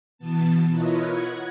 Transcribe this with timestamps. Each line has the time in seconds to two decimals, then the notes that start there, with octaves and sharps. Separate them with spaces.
0.18 B2 E3 B3 A5
0.69 E4 F4 A#4 B4 C#5 D#5
1.08 F#5 G#6